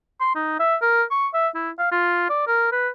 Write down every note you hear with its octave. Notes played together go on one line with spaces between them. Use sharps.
C6
D#4
E5
A#4
C#6
E5
E4
F5
F4
D5
A#4
B4